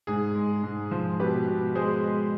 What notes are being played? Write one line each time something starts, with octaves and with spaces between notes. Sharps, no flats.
G#2 G#4
G#3
G#2
F3
B2 G4 B4
B2
G#3 G#4 C5
G#3